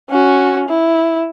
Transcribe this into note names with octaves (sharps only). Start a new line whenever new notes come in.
C#4 F#4
E4